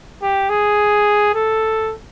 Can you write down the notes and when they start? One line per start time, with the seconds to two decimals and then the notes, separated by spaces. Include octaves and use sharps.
0.22 G4
0.50 G#4
1.34 A4